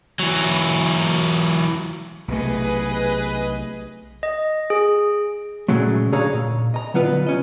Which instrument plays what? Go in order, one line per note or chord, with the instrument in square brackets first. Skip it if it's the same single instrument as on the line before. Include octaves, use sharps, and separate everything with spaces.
[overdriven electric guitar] E3 F#3
[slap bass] B1 C3 A3 [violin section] G#4 B4 D#5
[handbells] D#5
G#4
[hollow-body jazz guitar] A#2 C#3 F#3 G#3 A3
A#2 D3 G#4 C#5 F5 A#5
G2 A#2
D#5 A#5
D3 F#3 B3 F4 B4
C2 C#4 D#5